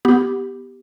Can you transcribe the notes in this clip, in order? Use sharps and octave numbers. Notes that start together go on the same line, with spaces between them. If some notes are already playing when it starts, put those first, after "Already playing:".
B3 G4